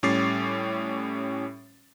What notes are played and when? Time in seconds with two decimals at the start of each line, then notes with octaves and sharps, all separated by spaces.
0.03 A2 G3 C#4 D6 A6 C7